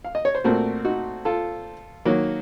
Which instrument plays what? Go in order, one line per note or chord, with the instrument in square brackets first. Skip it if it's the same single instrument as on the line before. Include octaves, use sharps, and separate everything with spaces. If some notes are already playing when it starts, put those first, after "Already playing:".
[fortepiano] F5
D#5
C#5
C5
A#2 A3 C4 F#4 A#4
D#4 F#4
F4 A4
D#3 F#3 A#3